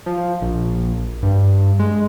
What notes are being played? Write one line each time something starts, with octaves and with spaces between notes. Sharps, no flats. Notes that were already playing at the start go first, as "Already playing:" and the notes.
F3
A#1
G2
G#3